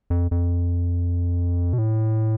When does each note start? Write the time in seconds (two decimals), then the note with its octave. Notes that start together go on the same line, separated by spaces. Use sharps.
0.10 F2
0.31 F2
1.73 B2
1.78 A2